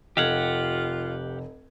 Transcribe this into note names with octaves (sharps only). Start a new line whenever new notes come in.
F1 F4 G4 A4 D#5 F5 F#5 G#6